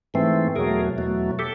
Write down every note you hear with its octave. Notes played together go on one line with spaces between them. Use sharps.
G#2 E3 A3 C4
E2 B2 F#3 A3 G#4 A#4
E2 B2 F#3 A3
G4 A4